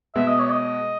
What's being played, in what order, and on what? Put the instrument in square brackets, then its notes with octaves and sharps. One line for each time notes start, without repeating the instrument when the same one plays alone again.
[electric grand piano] B2 G#3 B3 [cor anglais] E5
[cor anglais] D#5
C#5
D#5